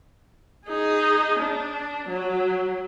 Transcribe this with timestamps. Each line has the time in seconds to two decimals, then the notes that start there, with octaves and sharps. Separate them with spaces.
0.67 D#4 G#4
1.40 D4
2.09 F#3